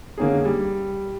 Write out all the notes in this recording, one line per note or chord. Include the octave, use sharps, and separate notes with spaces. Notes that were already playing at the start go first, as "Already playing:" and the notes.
D3 A#3 C#4 D#4 G#4
G3